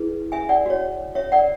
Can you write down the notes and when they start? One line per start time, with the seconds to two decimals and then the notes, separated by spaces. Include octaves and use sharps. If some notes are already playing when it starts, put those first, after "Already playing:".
Already playing: E4 G#4 B4
0.32 E5 G#5
0.49 D5 F#5
0.66 F#4 C#5
1.15 C#5 E5
1.32 D5 F#5